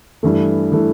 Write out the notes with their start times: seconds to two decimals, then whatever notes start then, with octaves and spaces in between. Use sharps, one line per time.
0.23 G2 E3 A3
0.72 E3 A3